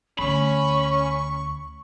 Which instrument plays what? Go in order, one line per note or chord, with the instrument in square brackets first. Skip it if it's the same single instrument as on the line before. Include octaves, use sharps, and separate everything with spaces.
[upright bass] D2 [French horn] C#4 [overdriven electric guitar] B5 [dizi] C#6